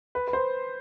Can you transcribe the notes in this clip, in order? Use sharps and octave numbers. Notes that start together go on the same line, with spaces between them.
B4
B4
C5